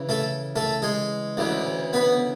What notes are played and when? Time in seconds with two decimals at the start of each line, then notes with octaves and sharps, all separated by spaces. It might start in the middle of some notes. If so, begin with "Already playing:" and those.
Already playing: C#3 E3
0.09 A3 A4
0.56 A3 A4
0.82 G#3 G#4
1.37 D2 C#3 E3
1.93 B3 B4